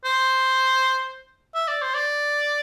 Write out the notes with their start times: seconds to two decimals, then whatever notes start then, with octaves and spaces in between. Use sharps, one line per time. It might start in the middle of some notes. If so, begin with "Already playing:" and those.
0.05 C5
1.55 E5
1.68 D5
1.82 C5
1.94 D5